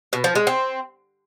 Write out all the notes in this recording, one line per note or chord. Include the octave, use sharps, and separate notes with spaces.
B2
F3
G#3
C4